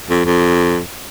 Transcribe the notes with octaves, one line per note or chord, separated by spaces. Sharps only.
F2
F2